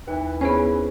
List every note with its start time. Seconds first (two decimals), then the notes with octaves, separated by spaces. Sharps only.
0.08 D#2 E3
0.41 B3 C#4 G#4 C5